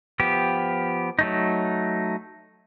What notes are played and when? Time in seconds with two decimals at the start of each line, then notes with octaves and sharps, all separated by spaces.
0.20 F3 B3 G4
1.19 F#3 A3 D#4